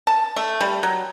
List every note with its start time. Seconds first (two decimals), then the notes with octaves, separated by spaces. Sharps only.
0.07 A5
0.36 A3
0.61 G3
0.83 F#3